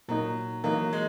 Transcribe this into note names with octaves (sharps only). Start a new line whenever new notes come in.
A#2 F#3 A#3 D#4
E3 F#3 A#3 D#4 A#4
G#3